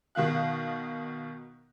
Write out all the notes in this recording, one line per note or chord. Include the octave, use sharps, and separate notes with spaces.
B2 D#3 F5 F#6